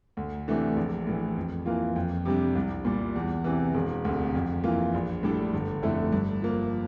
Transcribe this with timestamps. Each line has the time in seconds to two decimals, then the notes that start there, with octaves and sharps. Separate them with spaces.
0.17 D2
0.48 C3 E3 A3 D4
0.76 A#1
1.07 A2 E3
1.36 F2
1.66 E3 A#3 F4
1.96 F2
2.26 C3 G3 D4
2.55 C2
2.85 A#2 G3
3.15 E2
3.44 C3 E3
3.74 E1
4.05 D2 C3
4.35 F2
4.64 E3 A#3 F4
4.94 A#1
5.23 A2 G3 D4 A4
5.54 G1
5.82 F2 D3 A3 E4
6.12 G2
6.42 F3 A#3